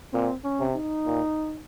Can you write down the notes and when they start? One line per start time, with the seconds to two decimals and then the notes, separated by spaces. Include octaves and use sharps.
0.13 A#2 C4
0.44 C#4
0.60 C3
0.76 D#4
1.06 A#2